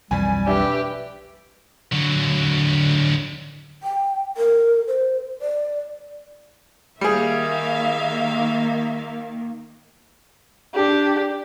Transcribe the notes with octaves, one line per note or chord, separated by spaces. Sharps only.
B1 F2 E3 G3 G#5
D4 G4 B4 E5
D3 F#3
G5
A#4
C5
D5
D#3 G3 A#3 G#4 E5 F5
D4 G4